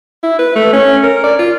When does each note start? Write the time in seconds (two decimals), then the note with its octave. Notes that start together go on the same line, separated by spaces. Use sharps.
0.23 E4
0.39 B4
0.56 A3
0.73 C#4
1.03 A#4
1.23 D5
1.39 F4